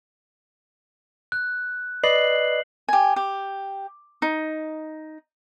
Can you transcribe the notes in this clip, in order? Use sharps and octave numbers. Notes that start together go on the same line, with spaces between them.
F#6
B4 D5 D#5 C7 F#7
G4 G#5
G4
D#4